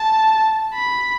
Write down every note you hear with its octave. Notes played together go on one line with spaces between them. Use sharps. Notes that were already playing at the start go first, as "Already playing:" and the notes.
Already playing: A5
B5